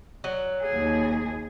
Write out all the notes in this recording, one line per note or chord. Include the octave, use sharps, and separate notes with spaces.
F#3
D#2 G#4